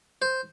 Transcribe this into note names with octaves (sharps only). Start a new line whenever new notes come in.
C5